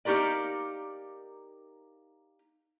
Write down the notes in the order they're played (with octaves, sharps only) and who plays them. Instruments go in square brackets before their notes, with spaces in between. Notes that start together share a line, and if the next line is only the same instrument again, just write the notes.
[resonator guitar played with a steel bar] A#3 D#4 F#4 G4 A#4 D5